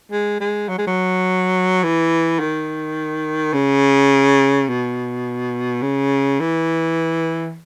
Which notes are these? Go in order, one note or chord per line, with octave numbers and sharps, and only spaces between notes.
G#3
G#3
F#3
G#3
F#3
E3
D#3
C#3
B2
C#3
E3